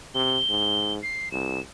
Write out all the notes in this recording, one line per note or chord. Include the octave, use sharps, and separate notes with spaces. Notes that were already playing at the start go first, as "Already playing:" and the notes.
C3 G7
G#2
C7
C2 E7